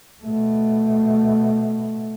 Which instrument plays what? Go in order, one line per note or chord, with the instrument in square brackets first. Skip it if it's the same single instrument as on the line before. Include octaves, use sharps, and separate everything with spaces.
[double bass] B2 A3